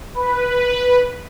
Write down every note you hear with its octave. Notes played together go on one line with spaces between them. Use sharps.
B4